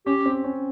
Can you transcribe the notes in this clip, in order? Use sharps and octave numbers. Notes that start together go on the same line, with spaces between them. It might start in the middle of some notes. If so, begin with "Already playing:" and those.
C#4 G4
C4
C#4